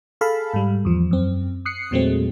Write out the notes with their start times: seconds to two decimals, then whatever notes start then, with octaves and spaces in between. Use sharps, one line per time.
0.21 G#4 A4 F5 A5 B5
0.54 G#2 G3
0.85 E2 F3
1.11 F#2 C4
1.65 D#6 F#6 C7 C#7
1.91 E2 A#2 F#3 G#3 A3 C4